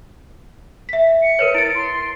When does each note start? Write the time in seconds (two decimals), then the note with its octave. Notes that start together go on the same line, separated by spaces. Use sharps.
0.89 E5 B6
1.22 C#7
1.39 A#4 B4 C#5
1.55 E4 A6 D7
1.75 C6